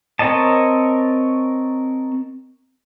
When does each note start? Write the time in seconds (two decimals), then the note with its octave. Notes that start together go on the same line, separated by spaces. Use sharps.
0.19 C4 A#4 C#5 D#5 A5